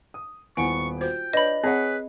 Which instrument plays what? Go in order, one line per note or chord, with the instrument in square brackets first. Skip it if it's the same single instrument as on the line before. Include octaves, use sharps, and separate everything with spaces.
[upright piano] D#6
[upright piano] D#1 B3 D7 [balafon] E4 G#5 [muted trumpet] C#6
[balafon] F4 F#4 C5 [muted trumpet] G5
[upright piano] D4 [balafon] B4 C#5 [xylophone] D#5 B5
[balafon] C4 [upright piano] G#4 C#5 F#5 [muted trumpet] B4